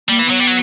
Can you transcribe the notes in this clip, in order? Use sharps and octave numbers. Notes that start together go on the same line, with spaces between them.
G3 A#3
E3
F#3 B3
G3
F#3